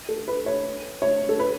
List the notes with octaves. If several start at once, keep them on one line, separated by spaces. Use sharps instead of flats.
A4
B4
C#5
C#5
A4
B4